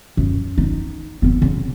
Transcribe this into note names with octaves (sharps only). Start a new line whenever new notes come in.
F#2
D#4
B3 C4
C#3